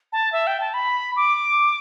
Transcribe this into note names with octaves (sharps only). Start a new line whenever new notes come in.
A5
E5
G5
A5
B5
D6